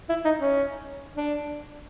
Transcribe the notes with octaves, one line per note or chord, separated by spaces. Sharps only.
E4
D#4
C#4
D4